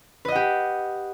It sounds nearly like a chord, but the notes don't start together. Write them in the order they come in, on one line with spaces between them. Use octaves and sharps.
B4 D#5 F#5 G4